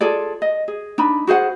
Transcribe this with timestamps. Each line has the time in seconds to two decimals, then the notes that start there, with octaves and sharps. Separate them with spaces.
0.01 F4 G#4 A4 D5
0.42 D#5
0.68 G#4
0.98 D4 D#4 B5
1.27 F#4 G#4 C5 F#5